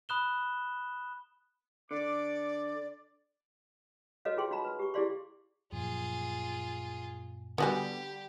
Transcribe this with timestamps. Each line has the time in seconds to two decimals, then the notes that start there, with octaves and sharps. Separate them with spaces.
0.09 B5 D#6 F#6 E7 G7
1.91 D3 D5 D6
4.25 F#4 A4 B4 C#5 D#5 F5
4.37 F4 G#4 G5 C6
4.51 D#4 F#4 F5 A#5 B5
4.65 B4
4.79 G4 C#6
4.94 E4 G4 G#4 D5 F5 C6
5.72 F#2 A#2 F3 F4 G#4
7.58 D3 G3 B3 F#4 G4 G#5